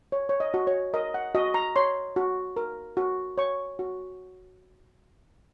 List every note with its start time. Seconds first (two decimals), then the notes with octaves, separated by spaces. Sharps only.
0.12 C#5
0.29 C#5
0.40 D#5
0.54 F#4
0.67 C#5
0.94 A#4 D#5
1.14 F#5
1.35 F#4 D#5
1.54 A#5
1.76 C#5 C6
2.16 F#4
2.57 A#4
2.97 F#4
3.38 C#5 C#6
3.79 F#4